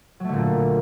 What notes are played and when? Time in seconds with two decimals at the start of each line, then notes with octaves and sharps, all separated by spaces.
0.20 F#3
0.24 A3
0.29 D3
0.33 A#2